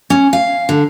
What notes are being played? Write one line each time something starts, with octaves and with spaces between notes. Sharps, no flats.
C#4
F5
D3